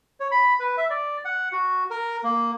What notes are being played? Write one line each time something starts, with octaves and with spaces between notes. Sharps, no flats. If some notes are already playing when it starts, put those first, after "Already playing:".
C#5
B5
B4
E5
D5
F#5
F#4
A#4
A#3